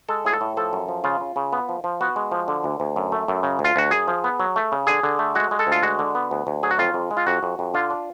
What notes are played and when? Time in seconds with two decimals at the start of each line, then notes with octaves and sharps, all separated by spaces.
0.09 G#3 A4
0.25 A2 G#4
0.33 A4
0.41 A2
0.57 F3 A4
0.73 F#2
0.88 F3
1.04 C#3 F4
1.20 C#3
1.36 C#3
1.53 B3
1.69 F3
1.84 F3
2.01 B3 F#4
2.16 G#3
2.31 F3
2.48 D3
2.64 D2
2.80 D2
2.96 F#2
3.12 A3
3.28 F#2
3.43 C#3
3.59 D2
3.64 F4
3.76 D2 F#4
3.91 F#2 G#4
4.08 F3
4.24 B3
4.40 F#3
4.56 A3
4.72 C#3
4.87 D3 G#4
5.03 D3
5.19 A3
5.35 G#3 F#4
5.51 G#3
5.59 A4
5.67 D2 F4
5.83 G#3 F#4
5.99 D3
6.15 B3
6.31 D2
6.47 D2
6.63 F#3 G#4
6.71 F#4
6.79 F2 F4
6.94 F2
7.11 G#3
7.17 F4
7.27 F2 F#4
7.43 F2
7.59 F2
7.74 D3 F4
7.90 D4